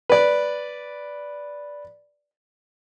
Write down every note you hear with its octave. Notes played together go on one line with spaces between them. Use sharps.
B4 D5